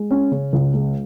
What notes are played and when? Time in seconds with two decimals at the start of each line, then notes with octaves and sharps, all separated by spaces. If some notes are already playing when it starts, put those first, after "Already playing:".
Already playing: G#3
0.11 C#4
0.31 C#3
0.53 C#2
0.74 G#3